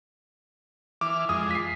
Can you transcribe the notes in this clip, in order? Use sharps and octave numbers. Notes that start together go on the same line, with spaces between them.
E3 D6 F6
F2 G#3 D#6
B6 C7